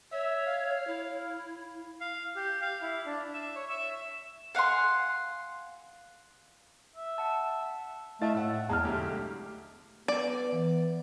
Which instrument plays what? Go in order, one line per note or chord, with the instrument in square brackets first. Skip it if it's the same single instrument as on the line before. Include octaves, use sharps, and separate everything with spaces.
[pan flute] C#5 [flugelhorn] E5
[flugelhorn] F5
[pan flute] E4
[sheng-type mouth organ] F5
G4
F5
E4
D4
E5
C#5
E5
[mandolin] F5 F#5 G#5 C6
[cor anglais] E5
[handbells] F#5 A5
[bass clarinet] A3 [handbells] E4 D#5 A5 [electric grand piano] F5 A6
[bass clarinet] A2 [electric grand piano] F#5 E6
[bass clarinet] E2 [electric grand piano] G#3 [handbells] A5 A#5 F6
[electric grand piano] B1 D3 G4 [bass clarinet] A3
[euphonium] B3 [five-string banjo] D5
[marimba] E3